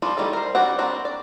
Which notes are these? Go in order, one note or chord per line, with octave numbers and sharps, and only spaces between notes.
F3 G3 C4 D4
D#3 G3 A3 E4 A4
A#4 C5
G3 C4 D4 F#4 F#5
A#3 C4 D4 F#4
D5